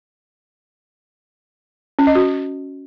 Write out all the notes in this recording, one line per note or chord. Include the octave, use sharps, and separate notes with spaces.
C#4
D#5
F#4